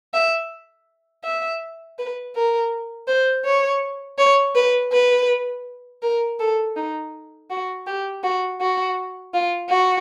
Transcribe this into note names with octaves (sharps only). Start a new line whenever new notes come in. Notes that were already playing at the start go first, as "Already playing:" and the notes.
E5
E5
B4
A#4
C5
C#5
C#5
B4
B4
A#4
A4
D#4
F#4
G4
F#4
F#4
F4
F#4